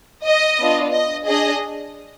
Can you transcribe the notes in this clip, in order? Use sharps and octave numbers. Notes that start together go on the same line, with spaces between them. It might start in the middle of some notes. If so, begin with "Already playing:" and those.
D#5
B3 D4 F4
D#5
D4 G#4 D#5